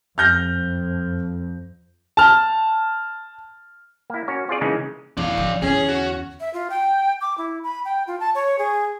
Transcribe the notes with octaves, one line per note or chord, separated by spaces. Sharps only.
F2 F6 G6 A#6
A5 F6
A#3 E4
C#4 F#4 A#4 C#5
C4 F4 G#4 D5
C#3 E3 G#3 A#3 C#4 D#4
E2 D4 F5
D3 F3
E2 D3 C#4 G#4
F#4
E5
F4
G5
D6
E4
B5
G5
F4
A5
C#5
G#4